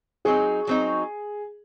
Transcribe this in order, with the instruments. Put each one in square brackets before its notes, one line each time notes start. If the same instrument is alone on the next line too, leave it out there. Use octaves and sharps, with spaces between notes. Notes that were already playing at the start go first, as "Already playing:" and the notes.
[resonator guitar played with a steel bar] F#3 C4 D#4 [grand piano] G#4
[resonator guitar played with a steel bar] F#3 C4 D#4